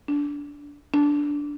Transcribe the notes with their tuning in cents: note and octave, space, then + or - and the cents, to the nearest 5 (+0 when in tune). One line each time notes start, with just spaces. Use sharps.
D4 -20
D4 -10